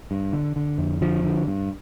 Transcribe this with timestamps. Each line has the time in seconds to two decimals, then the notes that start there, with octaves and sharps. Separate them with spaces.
0.11 G2
0.33 D3
0.56 D3
0.78 F2
1.01 D3 F3
1.24 D3
1.47 G2